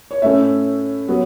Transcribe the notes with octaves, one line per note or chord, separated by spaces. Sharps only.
C#5
A2 A3 C#4 E5
F#3 B3